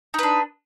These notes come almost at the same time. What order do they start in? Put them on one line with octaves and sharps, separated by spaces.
D#4 B4 D4